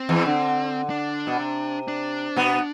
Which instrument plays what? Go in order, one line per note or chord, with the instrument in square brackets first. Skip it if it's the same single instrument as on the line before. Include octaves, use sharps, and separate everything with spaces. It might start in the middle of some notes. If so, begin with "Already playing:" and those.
Already playing: [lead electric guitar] C4
[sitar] E2 E3
D3
[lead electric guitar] D4
[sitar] B2
C3
[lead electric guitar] D4
[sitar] B2 B3